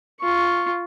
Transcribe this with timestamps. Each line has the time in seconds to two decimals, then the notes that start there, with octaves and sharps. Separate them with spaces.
0.21 F4 C#6